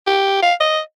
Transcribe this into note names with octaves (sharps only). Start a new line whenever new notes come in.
G4
F5
D#5